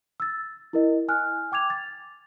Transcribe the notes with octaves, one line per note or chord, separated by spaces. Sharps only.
E6 A6
E4 A#4 D#5
G#5 F6 F#6
G5 D6 G#6 F7
A6